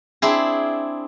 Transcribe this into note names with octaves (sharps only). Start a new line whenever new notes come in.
C4 D4 E4 G#4